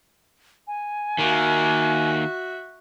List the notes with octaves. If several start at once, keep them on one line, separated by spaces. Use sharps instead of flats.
G#5
D#3 A#3 F#4 E5